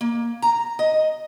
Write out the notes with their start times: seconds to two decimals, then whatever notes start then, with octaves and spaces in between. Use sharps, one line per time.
0.01 A#3
0.42 A#5
0.79 D#5